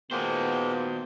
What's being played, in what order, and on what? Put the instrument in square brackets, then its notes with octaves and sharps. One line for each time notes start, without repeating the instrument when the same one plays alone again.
[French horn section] A#2 D#3 B3 [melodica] G#3 A#3 G5 [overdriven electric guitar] F#4 C5